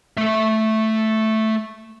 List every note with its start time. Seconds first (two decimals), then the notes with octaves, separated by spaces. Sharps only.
0.18 A3 E5